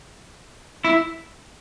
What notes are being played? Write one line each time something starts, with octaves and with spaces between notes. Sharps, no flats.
E4